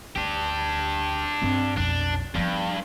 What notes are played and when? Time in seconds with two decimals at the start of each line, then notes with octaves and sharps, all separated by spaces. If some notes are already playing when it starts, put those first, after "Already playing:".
0.16 D2 D4 G4
1.42 G2 C4
1.77 B1 F2 D4
2.35 G2 F3 B3